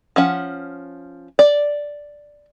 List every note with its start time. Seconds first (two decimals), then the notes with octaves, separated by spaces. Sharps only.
0.16 F3 C#4 F#5
1.39 D5